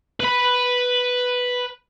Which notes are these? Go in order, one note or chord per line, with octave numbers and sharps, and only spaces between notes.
B4 B5